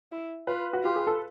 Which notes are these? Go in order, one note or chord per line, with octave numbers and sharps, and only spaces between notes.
E4
F4 B4
F#4
F4 G4
G#4
A4